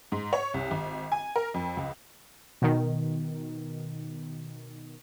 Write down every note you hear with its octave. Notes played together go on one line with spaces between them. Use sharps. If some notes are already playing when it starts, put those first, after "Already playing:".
G#2
C#5
C2
G#1
G#5
A#4
F2
C#2
B2 D#3